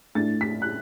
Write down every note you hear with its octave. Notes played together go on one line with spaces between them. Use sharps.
A2 A3 D4 A6
B6
F#6